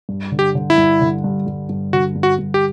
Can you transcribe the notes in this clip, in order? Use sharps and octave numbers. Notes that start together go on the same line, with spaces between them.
G2
D3
G4
D3
E4
G2
D3
G2
G2
G2
D3 F#4
G2
F#4
G2
G4